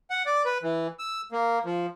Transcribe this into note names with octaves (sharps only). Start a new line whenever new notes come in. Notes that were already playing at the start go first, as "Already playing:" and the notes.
F#5
D5
B4
E3
E6
A#3
F3